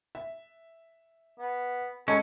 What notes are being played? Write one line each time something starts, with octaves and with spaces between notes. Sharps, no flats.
E5
B3
G#3 C#4 A4 A5